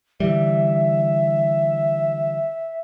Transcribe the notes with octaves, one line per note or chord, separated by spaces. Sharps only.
D3 E3 G3 E5